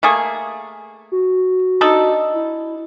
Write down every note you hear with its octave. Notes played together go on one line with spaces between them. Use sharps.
A3 A#3 G#4
F#4
D4 D#4 A4
E4